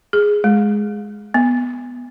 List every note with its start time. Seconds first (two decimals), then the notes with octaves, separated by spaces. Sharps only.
0.13 G#4
0.44 G#3
1.34 B3